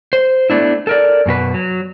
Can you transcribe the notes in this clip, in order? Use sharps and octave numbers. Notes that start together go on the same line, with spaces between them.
C5
A3 B3 D4 E4
A4 A#4 D5
F#2 B2 F#4 B4
F#3